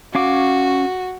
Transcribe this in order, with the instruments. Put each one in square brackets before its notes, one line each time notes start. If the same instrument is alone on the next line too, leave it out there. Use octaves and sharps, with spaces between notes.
[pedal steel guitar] C#4 F5 D6 [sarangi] F#4